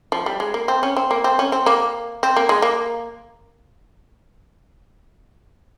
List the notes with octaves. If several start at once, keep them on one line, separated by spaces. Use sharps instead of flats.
F3
G3
G#3
A#3
C4
C#4
C4
A#3
C4
C#4
C4
A#3
C4
A#3
G#3
A#3